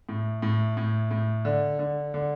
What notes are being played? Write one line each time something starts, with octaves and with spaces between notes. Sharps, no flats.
A2
A2
A2
A2
D3
D3
D3